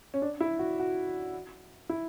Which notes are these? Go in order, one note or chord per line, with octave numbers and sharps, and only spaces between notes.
C#4
D4
E4
F#4
F#4
E4